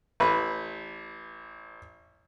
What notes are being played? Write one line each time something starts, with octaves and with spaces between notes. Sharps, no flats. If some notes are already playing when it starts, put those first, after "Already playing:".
A1 B4